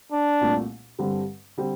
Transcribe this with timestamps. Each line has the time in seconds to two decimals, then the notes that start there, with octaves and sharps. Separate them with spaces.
0.13 D4
0.41 C2 A#2 A3
0.99 G2 D3 G3 C4
1.57 D3 G3 C4